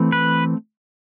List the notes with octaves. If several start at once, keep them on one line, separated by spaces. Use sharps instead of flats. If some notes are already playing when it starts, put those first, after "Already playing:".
Already playing: E3 A3 C4
B4